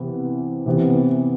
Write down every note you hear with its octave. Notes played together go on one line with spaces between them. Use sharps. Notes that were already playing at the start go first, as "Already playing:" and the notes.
Already playing: C3 E3 B3
C3 E3 B3